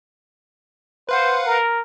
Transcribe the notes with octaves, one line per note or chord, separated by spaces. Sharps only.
B4 C5 F5 F#5
A#4